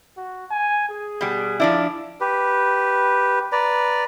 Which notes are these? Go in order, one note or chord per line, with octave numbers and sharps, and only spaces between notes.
F#4
G#5
G#4
B2 G3
F3 D4 E4 D5
G4 B4
B4 D5 A#5